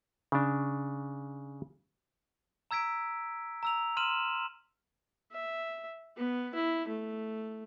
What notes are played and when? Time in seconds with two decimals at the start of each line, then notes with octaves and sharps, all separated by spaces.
0.32 C#3 D4
2.71 A#5 E6 G#6 B6 D7
3.63 A#5 E6 F7
3.97 C6 F6 D#7 E7 F#7
5.32 E5
6.16 B3
6.54 E4
6.88 A3